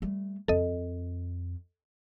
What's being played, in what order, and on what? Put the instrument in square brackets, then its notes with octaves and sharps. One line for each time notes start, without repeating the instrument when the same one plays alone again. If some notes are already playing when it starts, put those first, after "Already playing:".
[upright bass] G3 A3
[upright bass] F2 [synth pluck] A4 D#5